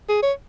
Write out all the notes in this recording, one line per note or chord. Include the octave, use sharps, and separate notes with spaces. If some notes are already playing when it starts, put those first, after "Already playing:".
G#4
C#5